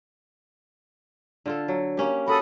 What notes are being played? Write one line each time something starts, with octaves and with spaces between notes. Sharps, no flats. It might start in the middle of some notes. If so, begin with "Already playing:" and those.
D3 F4 A4
F#3
A#3 C#4 G4
F#4 A4 B5 D#6